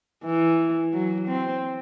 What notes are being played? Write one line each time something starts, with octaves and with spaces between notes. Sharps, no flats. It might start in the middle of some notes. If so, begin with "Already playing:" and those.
E3
F#3
C4